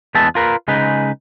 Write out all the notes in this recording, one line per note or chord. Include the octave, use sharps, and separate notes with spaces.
E2 G#3 B3 E5 A5
F4 A#4 B4
C#3 G#3 D#4 B4